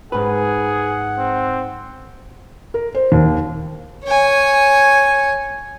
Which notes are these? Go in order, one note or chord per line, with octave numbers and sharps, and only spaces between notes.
G#2 G#4 B4 F#5
C4
A#4
C5
D#2
C#5 G#5